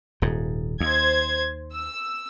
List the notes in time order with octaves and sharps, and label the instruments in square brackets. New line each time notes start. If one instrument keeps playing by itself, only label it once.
[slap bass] D#1 G#2
[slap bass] D#2 [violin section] C5 G#6
[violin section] E6